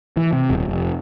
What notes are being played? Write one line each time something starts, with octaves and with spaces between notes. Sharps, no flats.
E3
C3
D#1
F1